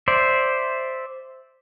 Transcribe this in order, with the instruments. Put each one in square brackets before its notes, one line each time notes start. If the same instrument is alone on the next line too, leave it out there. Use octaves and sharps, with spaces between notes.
[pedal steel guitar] C5 D5 E5